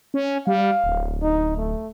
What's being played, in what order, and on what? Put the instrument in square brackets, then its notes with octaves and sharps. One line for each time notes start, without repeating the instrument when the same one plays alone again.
[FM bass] C#4
[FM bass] G3 [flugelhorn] F5
[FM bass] D1
[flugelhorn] D#4
A3